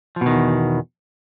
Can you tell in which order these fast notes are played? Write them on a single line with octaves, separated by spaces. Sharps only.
F3 B2 D#3 E2